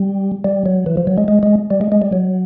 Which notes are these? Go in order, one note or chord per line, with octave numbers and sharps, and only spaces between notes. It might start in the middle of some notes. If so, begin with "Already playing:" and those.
Already playing: G3
G3
F#3
E3
F3
F#3
G#3
G#3
G#3
G3
G#3
G#3
G3
F#3